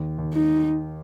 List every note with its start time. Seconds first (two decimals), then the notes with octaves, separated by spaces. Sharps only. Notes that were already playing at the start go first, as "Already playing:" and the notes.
Already playing: D#2
0.18 D#2
0.34 D#4